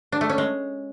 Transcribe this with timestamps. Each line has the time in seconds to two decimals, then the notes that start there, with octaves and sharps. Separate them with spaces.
0.12 D4
0.21 A3
0.29 C#4
0.38 G#3